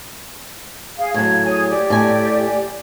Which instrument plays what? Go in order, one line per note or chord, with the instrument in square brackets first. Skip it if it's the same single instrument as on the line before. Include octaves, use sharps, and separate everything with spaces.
[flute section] G#4 F5
[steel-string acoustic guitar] A2 F#3 [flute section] G#6
[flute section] G#4 C#5 G#5
G4 D5
[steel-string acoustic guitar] A2 G#5